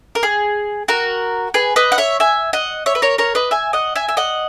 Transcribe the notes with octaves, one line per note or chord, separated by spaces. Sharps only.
A#4
G#4
F#4 A#4
G#4 B4
B4 D#5
F#5
C#5 E5
E5 G#5
D#5 F#5
C#5 E5
B4
A#4 C#5
A#4 C#5
B4 D#5
E5 G#5
D#5 F#5
E5 G#5
E5
D#5 F#5